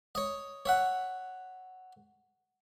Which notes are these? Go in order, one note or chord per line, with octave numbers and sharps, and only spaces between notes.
C#5 D#5
C#5 E5 F#5